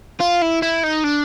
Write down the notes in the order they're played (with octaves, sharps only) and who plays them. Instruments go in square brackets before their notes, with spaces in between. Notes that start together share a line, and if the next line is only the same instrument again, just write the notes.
[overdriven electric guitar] F4
E4
E4
D#4
D4